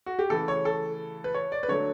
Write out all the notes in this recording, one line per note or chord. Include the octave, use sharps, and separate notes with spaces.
F#4
G4
C#3 E3 A3 A4
C#5
A4
B4
C#5
D5
B4
D3 F#3 A3 C#5